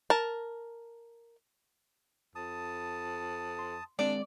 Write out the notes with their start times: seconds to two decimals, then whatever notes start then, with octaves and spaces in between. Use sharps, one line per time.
0.10 A#4 A5
2.35 F2 A5 D#6
3.59 C6
3.99 G#3 C4 D4 D5